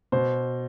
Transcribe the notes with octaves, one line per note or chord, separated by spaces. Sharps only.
B2 C5